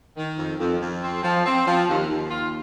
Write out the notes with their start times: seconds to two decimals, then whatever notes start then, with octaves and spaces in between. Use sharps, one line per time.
0.17 D#3
0.38 F2
0.60 F2
0.82 F2
1.03 C4
1.23 F3
1.46 C4
1.66 F3
1.89 D#2
2.10 D#2
2.30 F4